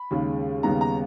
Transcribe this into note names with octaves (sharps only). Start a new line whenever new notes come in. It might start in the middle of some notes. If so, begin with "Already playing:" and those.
Already playing: B5
D#2 C#3 G#3
D#2 C#3 G3 B3 D#4 A#5
A#5